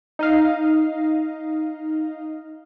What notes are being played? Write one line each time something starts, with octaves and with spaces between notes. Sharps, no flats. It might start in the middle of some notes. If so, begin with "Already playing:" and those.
D#4 D#5 F5